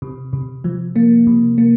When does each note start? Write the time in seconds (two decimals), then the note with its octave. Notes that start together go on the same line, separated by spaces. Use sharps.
0.02 C3
0.33 C3
0.64 F3
0.96 A#3
1.27 C3
1.58 A#3